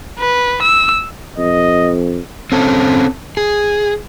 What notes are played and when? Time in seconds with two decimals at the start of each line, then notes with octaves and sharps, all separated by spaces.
0.19 B4
0.62 E6
1.38 F2 D#5
2.52 C4 C#4 A4
3.37 G#4